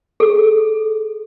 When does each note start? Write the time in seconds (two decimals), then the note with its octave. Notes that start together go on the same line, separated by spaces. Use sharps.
0.20 G#4 A4